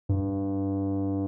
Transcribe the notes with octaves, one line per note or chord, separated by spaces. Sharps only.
G2